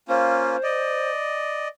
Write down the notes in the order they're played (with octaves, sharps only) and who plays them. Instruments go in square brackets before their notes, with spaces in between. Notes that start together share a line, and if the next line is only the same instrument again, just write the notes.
[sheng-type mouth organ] A#3 C#4 F4 [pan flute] C5
[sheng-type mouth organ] D5 D#5